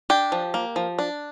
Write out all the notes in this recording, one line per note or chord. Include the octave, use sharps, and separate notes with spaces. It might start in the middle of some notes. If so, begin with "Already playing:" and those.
D4 G4
F3
A#3
F3
D4